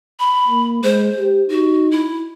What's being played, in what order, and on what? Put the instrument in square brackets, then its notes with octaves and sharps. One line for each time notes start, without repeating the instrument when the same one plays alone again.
[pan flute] B5
[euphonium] A#3
[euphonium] G#3 [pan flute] C5
[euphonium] G4
[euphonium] D#4 [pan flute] F#4
[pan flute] E4